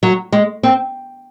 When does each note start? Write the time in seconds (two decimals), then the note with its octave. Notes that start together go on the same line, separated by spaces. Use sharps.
0.03 F#3
0.32 G#3
0.63 C4